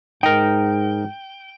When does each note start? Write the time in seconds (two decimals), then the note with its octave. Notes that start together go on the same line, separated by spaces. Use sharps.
0.23 G#2 D#4 A#4 G5